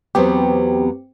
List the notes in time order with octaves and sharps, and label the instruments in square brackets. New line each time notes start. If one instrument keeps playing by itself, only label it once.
[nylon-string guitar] E2 F#3 B3 [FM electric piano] C4 G4